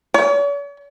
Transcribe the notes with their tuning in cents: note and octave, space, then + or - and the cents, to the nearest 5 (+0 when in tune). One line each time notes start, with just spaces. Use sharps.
C#5 +45